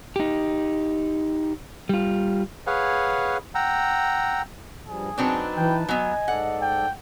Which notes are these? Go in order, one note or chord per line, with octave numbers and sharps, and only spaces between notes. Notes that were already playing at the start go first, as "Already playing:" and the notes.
D#4 G4
G3 F4
G#4 B4 C#5 F5 F#5 G#5
F#5 G5 A#5 E6
G2 F3 G3 G#4
F#3 C4 D4 D#4 B4 A5
E3 G5
F#3 B3 D#5 G#5
G#2 A4 D5 F#5
G5